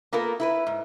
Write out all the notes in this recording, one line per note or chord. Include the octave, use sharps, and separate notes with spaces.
A#3 B3 F4 A4 A#4
E4 A#4 B4
G#2